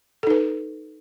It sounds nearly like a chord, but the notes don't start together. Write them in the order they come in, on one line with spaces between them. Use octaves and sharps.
A4 D#4 B4